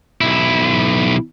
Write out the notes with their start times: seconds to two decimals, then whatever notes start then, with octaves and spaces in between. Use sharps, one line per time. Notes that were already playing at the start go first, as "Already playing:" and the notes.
0.21 B1 E4